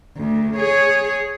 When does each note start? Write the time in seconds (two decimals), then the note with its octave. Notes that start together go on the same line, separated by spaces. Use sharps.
0.17 D2
0.56 G#4 C#5